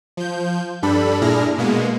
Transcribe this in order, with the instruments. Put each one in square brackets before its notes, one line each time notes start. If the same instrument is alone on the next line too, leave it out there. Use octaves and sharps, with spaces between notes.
[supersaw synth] F3 G6
G2 G3 D4 A4 B5
A#2 D4 E4 G#4 F6 A#6
B2 G#3 A#3 B3